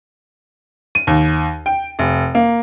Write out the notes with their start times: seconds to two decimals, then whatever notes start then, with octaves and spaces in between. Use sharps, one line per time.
0.95 D#7
1.07 D#2
1.66 G5
1.99 F1
2.35 A#3